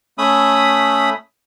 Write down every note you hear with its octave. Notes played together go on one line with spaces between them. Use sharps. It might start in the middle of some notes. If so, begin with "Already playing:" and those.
A3 C#4 E5 B5 D#6